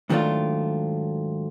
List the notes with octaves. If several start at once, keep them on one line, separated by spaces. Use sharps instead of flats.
G#2 D#3 F#3 A3 D4 F4